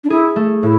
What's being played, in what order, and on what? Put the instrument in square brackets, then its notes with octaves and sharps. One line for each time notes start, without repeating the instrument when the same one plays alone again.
[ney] D4
[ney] E4 [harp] G#4
[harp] A3
[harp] A2 [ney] E4